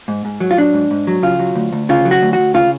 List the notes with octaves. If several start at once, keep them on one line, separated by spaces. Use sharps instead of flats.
G#2
G#2
F#3
F4
F#3 D4
G#2
G#2
F#3
C#3 F4
F#3
D2
D2
C#3 F4
F#3
F#4
D2
F#4
D2
C#3 F4